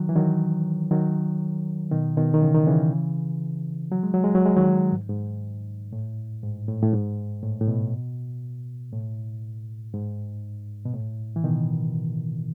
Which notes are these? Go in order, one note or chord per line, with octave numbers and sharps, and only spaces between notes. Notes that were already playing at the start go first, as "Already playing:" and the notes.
Already playing: D#3 F#3
E3
D#3 F#3
D#3 F#3
B2 D#3
B2 D#3
D#3
C#3 E3
D#3
C#3 E3
F#3
G#3
F#3
G#3
F#3
G#3
D#3 F#3
G#2
G#2
A2
G#2
A2
A2
G#2
A2
A2
B2
A2
G#2
B2
A2
E3
B2 D#3